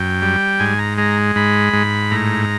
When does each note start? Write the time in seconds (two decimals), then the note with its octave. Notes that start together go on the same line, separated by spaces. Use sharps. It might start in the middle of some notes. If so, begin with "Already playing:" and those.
Already playing: F#2 G5
0.22 G3
0.59 G#2 G#5
0.79 A#5
0.98 G#3 A#5
1.36 G#2 B5
1.73 G#2
2.11 A2 A#5